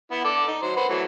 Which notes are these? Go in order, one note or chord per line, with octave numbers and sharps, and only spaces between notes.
B3 E4
A4 D5
D#4
F#3 C5
B4 C5 F#5
E3 F#3 A3